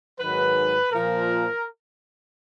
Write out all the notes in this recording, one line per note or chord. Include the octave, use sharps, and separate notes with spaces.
G#2 D#3 F#3 B4
A#2 F3 A#4